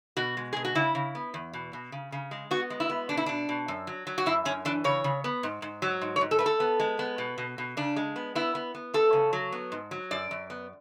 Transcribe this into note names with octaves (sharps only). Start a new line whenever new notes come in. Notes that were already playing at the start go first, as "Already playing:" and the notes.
B2 F#4
G#3
B2 G#4
F#4
C#3 E4
C#3
B3
E2
B2
B2
C#3
C#3
G#3
B3 F#4
G#3
E4
B3
B2 D4
E4
B2 D4
B2
F#2
F#3
F#3
F#4
F#2 E4
F#2 C#4
E3 D4
C#3 C#5
C#3
B3
G#2
G#2
F#3
G#2
C#5
G#2
A4
A3 B4
A4
B3
G#3
B3
B2
B2
B2
C#3 D4
G#3
B3
B3 E4
B3
B3
A3 A4
C#3
F#3
B3
G#2
F#3
F#2 D5
F#2
B3